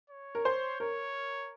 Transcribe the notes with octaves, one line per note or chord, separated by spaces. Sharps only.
C#5
A#4
C5
A#4 C#5